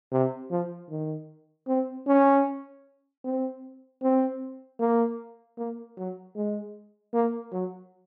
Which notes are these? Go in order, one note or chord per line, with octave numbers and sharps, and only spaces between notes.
C3
F3
D#3
C4
C#4
C4
C4
A#3
A#3
F#3
G#3
A#3
F#3